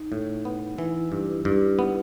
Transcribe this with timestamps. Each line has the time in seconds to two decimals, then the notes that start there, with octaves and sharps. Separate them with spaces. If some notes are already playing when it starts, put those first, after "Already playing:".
Already playing: D#4
0.12 A2
0.45 B3
0.78 E3 E4
1.12 G2
1.45 G2
1.79 B3